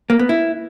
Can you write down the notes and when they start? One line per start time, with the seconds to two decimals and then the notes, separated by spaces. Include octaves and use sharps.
0.10 A#3
0.19 B3
0.29 E4